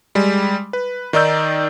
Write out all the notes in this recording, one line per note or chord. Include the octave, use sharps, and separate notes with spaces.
G3 G#3
B4
D#3 D#4 D5 E6 G6